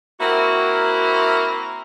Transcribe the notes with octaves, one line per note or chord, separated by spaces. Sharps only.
A#3 C4 E4 F#4 A#4